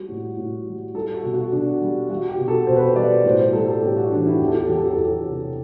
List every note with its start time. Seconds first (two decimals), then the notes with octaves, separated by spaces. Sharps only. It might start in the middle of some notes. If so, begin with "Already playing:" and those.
Already playing: G3 F#4
0.08 A2
0.37 A2
0.66 G3
0.95 G3 A4
1.14 F#4
1.23 B2
1.33 F#4
1.52 B2 D4
1.81 G3
2.09 G3 F#4
2.29 G4
2.38 B2
2.48 A4
2.67 B2 C5
2.76 B4
2.85 C5
2.96 G3 D5
3.24 A2 C5
3.39 C5
3.53 G3 A4
3.68 A4
3.82 A2 G4
3.97 F#4
4.11 E3 D4
4.26 E4
4.39 E2 G4
4.48 A4
4.55 G4
4.62 A4
4.69 F#3 G4
4.77 A4
4.85 G4
4.93 A4
4.98 E2 G4
5.26 C3